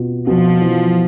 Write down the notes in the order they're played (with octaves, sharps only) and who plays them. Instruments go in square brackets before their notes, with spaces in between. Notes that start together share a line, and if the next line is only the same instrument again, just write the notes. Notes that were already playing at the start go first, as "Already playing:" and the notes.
Already playing: [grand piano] B2 B3 F4
[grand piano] B2 [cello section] F3
[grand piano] E3